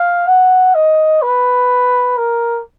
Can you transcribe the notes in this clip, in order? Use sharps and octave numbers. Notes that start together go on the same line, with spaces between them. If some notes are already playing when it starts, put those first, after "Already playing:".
Already playing: F5
F#5
D#5
B4
A#4